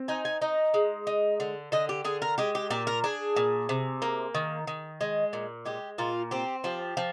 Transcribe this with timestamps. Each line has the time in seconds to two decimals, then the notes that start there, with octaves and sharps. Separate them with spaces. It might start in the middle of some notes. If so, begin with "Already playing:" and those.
Already playing: C4
0.08 D#4 G#5
0.25 G#5
0.42 D#4 D#5
0.74 G#3
1.07 D#4
1.40 D3
1.72 D3 D#5
1.89 G4
2.05 D3 G#4
2.22 A#4
2.38 G#3 G4
2.55 G4
2.70 A#2 G4
2.87 A#4
3.04 D4 G#4
3.36 A#2
3.69 C3
4.02 A#3
4.35 D#3
4.67 D#3
5.01 G#3
5.33 A#2
5.66 G#3 G4
5.98 A#2 F4
6.31 C4 G4
6.64 F3 G4
6.97 F3